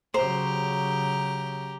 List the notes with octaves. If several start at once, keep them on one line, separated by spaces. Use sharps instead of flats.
C#3 F#3 G4 C5 A#5